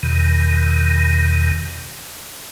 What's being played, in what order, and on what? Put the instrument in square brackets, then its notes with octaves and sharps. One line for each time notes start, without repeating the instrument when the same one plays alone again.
[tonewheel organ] E2 B2 D#3